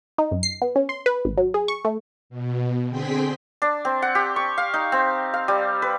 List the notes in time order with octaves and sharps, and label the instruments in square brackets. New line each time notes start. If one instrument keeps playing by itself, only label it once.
[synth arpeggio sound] D#4
F#2
C7
B3
C#4
C6
B4
G#1
F#3
G#4
C#6
A3
[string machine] B2
D3 C4 G#4 G5 C6 B6
[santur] D4
C4
F#5
G4
C#6
F5
D#4
C4
F5
G3
B4